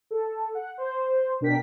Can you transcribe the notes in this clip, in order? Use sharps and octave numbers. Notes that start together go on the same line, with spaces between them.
A4
F#5
C5
B2 D4 A#4 G5 B6